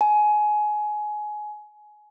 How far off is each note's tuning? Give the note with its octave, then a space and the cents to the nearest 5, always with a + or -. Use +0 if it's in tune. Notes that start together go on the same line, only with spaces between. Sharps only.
G#5 +20